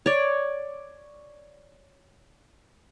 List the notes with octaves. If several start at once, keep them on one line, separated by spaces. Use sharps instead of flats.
C#5 D5